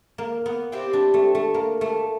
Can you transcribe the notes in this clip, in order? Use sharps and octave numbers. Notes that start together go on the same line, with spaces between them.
A#3
B3
G3 C4 E4 G4
D4
A3
A3
A#3
A3